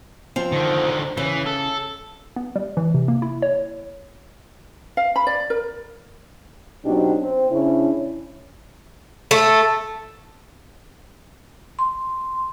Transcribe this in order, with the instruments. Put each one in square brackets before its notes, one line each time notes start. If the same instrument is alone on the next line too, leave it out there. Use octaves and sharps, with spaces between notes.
[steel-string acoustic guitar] F3 C4
[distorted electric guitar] D3 D#3
[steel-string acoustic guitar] C#3 [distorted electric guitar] E3
[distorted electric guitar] A4
[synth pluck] B3
G3
E3
C3
A#3
E4
C#5
[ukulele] F5
B5
D5
A#4
[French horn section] B2 F#3 C4 D4 D#4 G4
C4
C#3 C#4 D4 E4
[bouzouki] A3
[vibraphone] C6